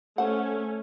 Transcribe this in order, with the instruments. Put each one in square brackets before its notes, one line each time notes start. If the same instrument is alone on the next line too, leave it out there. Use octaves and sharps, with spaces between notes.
[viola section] A3 C#4 [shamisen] C5 F#5